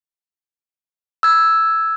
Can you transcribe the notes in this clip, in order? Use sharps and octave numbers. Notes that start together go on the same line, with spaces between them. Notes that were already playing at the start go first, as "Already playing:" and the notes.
E6 G#6